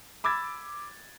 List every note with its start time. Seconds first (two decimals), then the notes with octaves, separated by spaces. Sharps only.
0.24 B5 D6 E6 G#6 A6